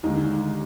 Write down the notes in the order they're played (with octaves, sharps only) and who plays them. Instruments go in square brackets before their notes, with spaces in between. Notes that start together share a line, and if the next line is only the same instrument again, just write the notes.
[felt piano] D#2 D3 G#3 D#4